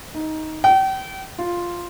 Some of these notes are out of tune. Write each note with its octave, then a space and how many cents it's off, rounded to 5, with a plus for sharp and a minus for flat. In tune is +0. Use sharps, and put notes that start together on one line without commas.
D#4 +10
G5 -35
F4 +0